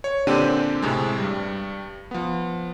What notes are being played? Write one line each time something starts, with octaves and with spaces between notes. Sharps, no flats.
C#5
A#2 D3 C4 D4 G4 D#7
A2 C3 G#3
G2 G3
F3 B3